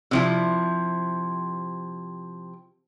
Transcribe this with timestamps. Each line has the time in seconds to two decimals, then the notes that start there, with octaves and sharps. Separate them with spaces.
0.11 C3 F3 E4